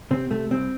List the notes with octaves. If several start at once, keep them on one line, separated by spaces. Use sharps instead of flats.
C3 C4
C3 A3
C2 C4